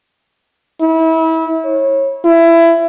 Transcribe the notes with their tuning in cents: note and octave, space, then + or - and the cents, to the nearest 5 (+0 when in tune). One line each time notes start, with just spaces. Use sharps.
E4 -30
C#5 -25
E4 +20